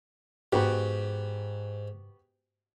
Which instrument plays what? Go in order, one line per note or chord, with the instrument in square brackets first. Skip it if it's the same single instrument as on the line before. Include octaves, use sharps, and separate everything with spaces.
[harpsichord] G#2 [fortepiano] B3 F#4 G4